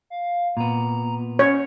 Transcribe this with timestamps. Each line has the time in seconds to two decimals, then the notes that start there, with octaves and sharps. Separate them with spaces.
0.10 F5
0.57 A#2 B3 A#5
1.39 C#4 C#5